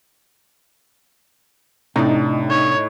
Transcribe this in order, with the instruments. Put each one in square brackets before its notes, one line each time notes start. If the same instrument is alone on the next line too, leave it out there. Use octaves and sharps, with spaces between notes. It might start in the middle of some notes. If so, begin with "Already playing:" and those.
[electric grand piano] A2 [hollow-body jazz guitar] C3 D4 [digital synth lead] D#4
[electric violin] C#5